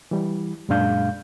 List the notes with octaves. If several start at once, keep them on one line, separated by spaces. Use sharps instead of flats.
E3 G3
F#2 A#2 G#3 D4 F5 G6